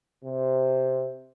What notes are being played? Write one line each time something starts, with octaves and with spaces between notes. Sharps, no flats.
C3